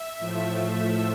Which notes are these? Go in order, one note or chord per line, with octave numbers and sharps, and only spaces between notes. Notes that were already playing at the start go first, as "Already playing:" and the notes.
Already playing: E5
A2 F3 A3